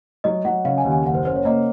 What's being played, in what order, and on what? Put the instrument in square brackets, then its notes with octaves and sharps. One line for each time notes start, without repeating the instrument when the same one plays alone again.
[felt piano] F#3 [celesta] D#5
[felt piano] F#3 [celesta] F#5
[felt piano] C#3 [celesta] F5
[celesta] G#5
[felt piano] D#2
[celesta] G#5
[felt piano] F#1 [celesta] F#5
[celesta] C5
[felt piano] C#3 [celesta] C5
[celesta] C#5
[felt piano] A#3 [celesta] D#5